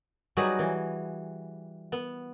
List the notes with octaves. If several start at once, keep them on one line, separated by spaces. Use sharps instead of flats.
F#3 G3 D#4 F#4 G#4 B4
E3
B3